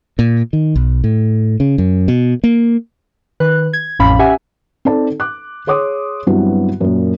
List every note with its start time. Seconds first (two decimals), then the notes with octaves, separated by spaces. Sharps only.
0.19 A#2
0.53 D#3
0.76 B1
1.04 A2
1.60 C#3
1.78 F#2
2.08 B2
2.44 A#3
3.40 D#3 B4 F#6
3.73 G#6
3.99 A1 F2 A2 C#4 F5 B5
4.19 C#4 G4 E5 F#5 G#5
4.85 C4 D#4 A4 D5 A5
5.20 D6 F#6
5.67 G#4 C#5 C6 D6 D#6
6.27 G2 F#3 B3 C4 E4 F#4
6.81 F#2 A#2